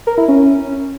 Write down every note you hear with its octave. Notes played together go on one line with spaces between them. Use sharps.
A#4
E4
C#4